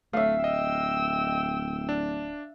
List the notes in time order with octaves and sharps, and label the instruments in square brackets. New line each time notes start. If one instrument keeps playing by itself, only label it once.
[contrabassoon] D1 [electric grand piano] A3 [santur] E5 F5
[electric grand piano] D#5 [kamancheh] G5 E6
[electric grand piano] D4